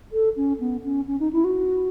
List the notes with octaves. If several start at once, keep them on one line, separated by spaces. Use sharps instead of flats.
A4
C#4
B3
C#4
C#4
D#4
E4
F#4